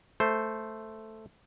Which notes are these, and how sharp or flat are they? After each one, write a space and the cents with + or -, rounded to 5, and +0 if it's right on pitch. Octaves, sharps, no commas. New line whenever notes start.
A3 +0 C5 +0